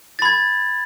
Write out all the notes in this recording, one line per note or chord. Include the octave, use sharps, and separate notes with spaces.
B5 G#6 A6